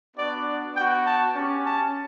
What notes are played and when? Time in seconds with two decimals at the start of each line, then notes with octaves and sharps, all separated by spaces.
0.16 B3 D4 F#4 D5
0.75 B3 F#4 G5
1.06 A5
1.35 C#4 G4
1.64 A5